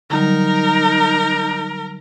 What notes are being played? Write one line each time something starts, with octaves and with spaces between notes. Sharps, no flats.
D3 F#3 G3 D#4 A#4 A#5